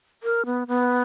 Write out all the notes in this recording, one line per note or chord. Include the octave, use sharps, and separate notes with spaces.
A#4
B3
B3